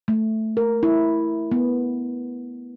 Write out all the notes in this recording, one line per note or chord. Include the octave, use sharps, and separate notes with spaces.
A3
A#4
E4
B3